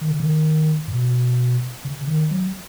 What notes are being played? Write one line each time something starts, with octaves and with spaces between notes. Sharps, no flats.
D#3
C#3
D#3
G#2
B2
C#3
D#3
F#3